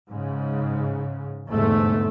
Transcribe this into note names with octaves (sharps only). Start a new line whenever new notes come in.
G#2 C#3
G1 E2 G#2 C3 A3